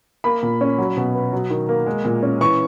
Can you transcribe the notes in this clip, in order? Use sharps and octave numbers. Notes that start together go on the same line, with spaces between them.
A#3 B5
A#2
C#4
F#3
B2
B3
F#3
D#3
A#3
G#3
A#2
C#4
E3 C#6